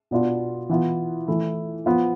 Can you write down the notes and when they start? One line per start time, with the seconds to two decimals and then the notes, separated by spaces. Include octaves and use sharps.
0.11 B2 B3 D4 F4
0.70 E3 B3 F4
1.28 E3 A3 E4
1.86 F3 B3 F4